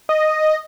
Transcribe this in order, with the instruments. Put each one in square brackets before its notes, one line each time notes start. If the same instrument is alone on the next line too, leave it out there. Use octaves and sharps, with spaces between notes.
[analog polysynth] D#5